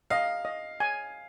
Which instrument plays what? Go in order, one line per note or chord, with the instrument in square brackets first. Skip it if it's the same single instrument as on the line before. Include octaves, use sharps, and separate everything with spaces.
[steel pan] D#5 [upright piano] F5
[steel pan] D#5
G#5